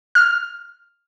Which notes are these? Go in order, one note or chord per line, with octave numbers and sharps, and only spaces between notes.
F6